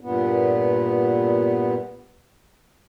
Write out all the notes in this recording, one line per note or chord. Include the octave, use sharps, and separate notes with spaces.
G2 A#2 B3